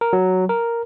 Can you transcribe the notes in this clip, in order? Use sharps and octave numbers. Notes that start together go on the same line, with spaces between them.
A#4
F#3
A#4